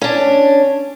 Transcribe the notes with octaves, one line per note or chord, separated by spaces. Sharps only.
C#4 D4